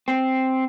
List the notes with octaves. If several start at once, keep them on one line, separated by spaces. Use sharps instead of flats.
C4